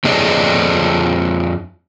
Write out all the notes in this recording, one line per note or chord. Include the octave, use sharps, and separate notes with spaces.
F2 D4 G#4 C#5 D#5